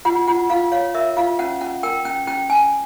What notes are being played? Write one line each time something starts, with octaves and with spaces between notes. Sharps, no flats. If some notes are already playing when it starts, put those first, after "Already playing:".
F4 F#5
F4 F#5
F4 F5
C#5 F5
A#4 E5
F4 F5
C#4 F#5
C#4 F#5
A#4 G5
C#4 G5
C#4 G5
C#4 G#5